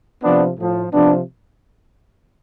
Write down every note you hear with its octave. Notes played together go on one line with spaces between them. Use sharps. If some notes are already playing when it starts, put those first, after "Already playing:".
C3 F3 B3 D4
A2 F3
C3 F3 B3 D4